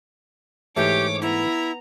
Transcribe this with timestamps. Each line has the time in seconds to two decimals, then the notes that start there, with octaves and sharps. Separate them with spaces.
0.77 G#2 E3 A3 G4 C#5 D6
1.22 B3 E4 A#5